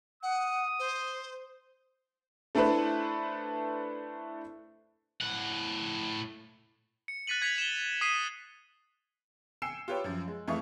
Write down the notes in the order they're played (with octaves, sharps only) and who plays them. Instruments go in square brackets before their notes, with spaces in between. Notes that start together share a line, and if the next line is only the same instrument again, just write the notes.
[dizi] F#5 [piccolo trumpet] D#6
[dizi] C5
[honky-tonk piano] A3 D4 E4 A4 B4 C5
[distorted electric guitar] A2 F#5
[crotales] C#7
F#6 A6 B6 D#7 F#7
G#6 B6 C#7 F7 F#7
E7 G7
D#6 B6 C7 D#7
[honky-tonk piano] G5 G#5 E6 C7 C#7 E7
F4 G4 B4 C#5 G5
F#2 F3
G#3
F2 E3 A3 F5 C#6 D#6